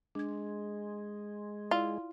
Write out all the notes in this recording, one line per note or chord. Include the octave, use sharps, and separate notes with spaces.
G#3 D4 G#6
E4 F4 D5